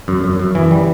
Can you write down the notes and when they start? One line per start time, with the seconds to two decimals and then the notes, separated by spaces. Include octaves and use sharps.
0.08 F#2
0.24 F#2
0.39 F#2
0.55 E3
0.71 G3